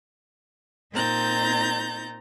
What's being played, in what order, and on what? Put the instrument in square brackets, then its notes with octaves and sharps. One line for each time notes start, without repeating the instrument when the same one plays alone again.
[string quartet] A#2 C4 D#4 A#5 G6 A6